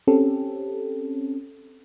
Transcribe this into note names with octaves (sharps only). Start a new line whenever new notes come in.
C4 C#4 G4 A4